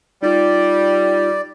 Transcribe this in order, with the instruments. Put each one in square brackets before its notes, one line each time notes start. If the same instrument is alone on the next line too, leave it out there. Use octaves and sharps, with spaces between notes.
[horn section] G3 [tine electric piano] D#4 F4 [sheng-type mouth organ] D5